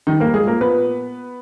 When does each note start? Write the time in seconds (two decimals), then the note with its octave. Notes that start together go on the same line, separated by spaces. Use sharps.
0.07 D#3 G3 D#4
0.20 G3 A#3 A#4
0.34 G#3 G#4
0.43 A#2 A#3 A#4
0.61 A#2 B3 B4